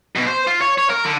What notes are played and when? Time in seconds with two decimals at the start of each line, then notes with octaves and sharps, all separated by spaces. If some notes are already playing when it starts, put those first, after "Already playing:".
0.15 B2
0.27 C5
0.47 F4
0.61 C#5
0.78 C#5
0.90 A#4
1.05 D3